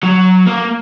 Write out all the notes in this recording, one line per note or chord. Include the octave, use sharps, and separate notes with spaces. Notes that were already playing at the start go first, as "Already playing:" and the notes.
F#3
A#3